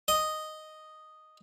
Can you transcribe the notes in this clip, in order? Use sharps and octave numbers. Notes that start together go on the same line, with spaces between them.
D#5